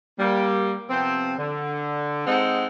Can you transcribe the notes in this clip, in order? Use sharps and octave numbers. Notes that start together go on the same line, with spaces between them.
G3 A#3
C3 F3 B3 C4
D3
G#3 C4 D#4 A4 F#5